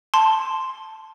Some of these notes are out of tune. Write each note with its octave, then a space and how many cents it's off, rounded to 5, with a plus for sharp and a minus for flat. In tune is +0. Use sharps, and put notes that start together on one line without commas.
A5 +0 C6 +0